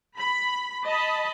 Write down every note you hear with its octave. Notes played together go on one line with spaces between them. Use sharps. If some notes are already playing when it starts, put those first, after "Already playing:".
B5
D#5 A5 B5